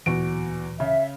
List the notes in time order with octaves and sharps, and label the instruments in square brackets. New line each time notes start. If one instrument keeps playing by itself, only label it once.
[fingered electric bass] D1 A#2 E3 [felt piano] E2 F#4 D7
[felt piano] C#3 [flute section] E5